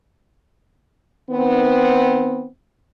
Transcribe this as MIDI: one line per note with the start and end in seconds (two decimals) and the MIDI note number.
1.30 2.46 51
1.30 2.46 59
1.30 2.46 60